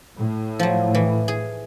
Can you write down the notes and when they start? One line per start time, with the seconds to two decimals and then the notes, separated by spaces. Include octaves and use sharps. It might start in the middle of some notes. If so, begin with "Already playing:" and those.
0.16 A2
0.59 F3 F#3
0.95 E3
1.28 G#4